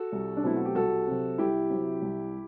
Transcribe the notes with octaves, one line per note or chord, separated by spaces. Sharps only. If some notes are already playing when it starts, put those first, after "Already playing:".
Already playing: F#4 A4
C2
D4
B2 F#3 A3 C4 E4
F#4
G4
C2 F#4 A4
C3 F#3 C4
C2 E4 G4
C3 F#3 C4
C2